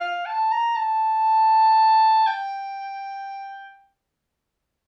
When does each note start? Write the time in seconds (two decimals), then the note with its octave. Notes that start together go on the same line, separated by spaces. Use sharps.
0.01 F5
0.26 A5
0.51 A#5
0.76 A5
2.27 G5